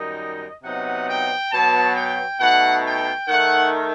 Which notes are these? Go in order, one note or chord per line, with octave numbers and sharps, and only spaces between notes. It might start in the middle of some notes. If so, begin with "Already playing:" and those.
Already playing: F#2 D#3 G3 D#4 D#5
C3 F#3 B3 D#4 F#5
G5
B2 F#3 B3 A5
G5
B2 A3 D#4 F#5
G5
D#3 A3 D#4 F#5